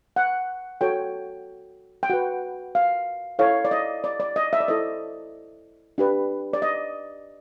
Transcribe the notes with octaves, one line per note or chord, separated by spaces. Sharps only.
F#5
F#4 A4 C#5 G5
G5
F#4 B4 F#5
F5
E4 A4 C#5 F5
D5
D#5
D5
D5
D#5
E5
D5
E4 A4 C5 D#5
D4 G4 B4
D5
D#5